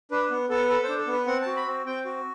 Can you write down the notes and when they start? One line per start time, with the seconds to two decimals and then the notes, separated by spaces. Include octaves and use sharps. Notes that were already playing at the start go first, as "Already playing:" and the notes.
0.11 D4 B4
0.31 B3
0.50 B3 A4
0.69 A4 B4
0.84 C5
0.89 D4
0.98 A4
1.07 B3
1.13 B4
1.27 C4 F#5
1.42 F#4 A5
1.57 B5
1.67 C4
1.86 C4 G5
2.05 F#4